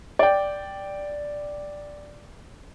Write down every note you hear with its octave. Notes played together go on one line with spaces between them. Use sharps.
D5 G5